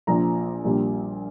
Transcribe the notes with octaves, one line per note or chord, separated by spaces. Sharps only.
A#1 A#2 F3 A#5
A#1 A#2 G3